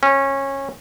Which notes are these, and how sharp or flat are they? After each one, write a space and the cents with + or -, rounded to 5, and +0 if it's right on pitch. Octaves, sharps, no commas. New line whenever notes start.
C#4 -20